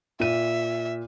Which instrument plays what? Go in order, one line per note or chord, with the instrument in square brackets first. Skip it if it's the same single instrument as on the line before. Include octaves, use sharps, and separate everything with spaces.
[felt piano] A#2 D#7 [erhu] E5